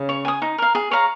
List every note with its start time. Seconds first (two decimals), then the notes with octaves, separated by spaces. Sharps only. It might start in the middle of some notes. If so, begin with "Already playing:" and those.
Already playing: C#3
0.09 C#5
0.25 G#5 D#6
0.42 D#4
0.58 A#4 F5
0.75 G#4
0.91 C#5 F5 A#5